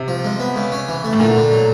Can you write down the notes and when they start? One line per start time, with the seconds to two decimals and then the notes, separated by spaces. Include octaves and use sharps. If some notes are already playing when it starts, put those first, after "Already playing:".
Already playing: C3
0.08 F3
0.25 G#3
0.40 B3
0.56 C#3
0.72 C#4
0.89 E3
1.04 A3
1.13 A2
1.20 A#2 D3
1.36 D3
1.52 F#3